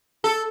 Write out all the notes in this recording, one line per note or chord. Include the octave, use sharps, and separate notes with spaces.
A4